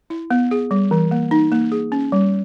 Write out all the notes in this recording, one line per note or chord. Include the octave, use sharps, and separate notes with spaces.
E4
B3
G#4
G3
E3
A#3
D#4
A#3
G#4
C#4
G3